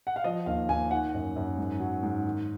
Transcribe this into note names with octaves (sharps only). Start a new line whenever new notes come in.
F#5
F5
F3 D#5
D#2 F5
D#2 G#5
D#3 F#5
F#2
F#2
G#2
F#3
G#2
D#3